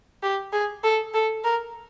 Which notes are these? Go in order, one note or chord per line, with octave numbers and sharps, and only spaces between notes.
G4
G#4
A4
A4
A#4